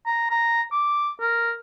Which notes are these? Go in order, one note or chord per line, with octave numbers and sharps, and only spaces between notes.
A#5
A#5
D6
A#4